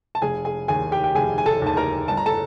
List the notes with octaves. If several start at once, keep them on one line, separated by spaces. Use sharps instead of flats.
A5
F1 G#4 G#5
G#4 G#5
D#2 D#3 G#4 G#5
G4 G5
G5
F1 G#4 G#5
G#5
A4 A5
D#2 D#3 A5
A#4 A#5
G1 A5
A#5
A4 A5